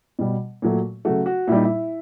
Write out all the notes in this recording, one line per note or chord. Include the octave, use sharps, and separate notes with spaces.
B2 G3
A#2 F#3 A3
C#3 F#3 A3 F#4
F#4
A#2 G3 D#4 E4
E4